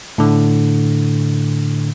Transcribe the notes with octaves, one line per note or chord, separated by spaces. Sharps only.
A2 D3